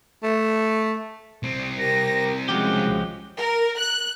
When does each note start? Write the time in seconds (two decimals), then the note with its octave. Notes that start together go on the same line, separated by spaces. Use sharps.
0.23 A3
1.43 C2 C4
1.78 G4 A#4 A#6
2.49 C#3 F3 G#3 F#4 G4
3.37 A#4
3.78 F#6